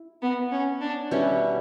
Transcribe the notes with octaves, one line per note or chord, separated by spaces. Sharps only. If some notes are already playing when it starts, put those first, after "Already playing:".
Already playing: E4
B3
C#4
D4
B2 G3 B3 C#4 E4